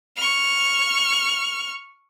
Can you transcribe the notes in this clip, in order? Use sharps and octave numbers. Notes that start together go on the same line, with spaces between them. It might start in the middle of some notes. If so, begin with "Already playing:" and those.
C#6 F6